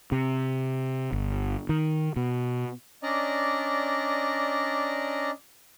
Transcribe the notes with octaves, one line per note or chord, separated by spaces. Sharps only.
C3
G1
D#3
B2
C#4 D4 D5 D#5 A#5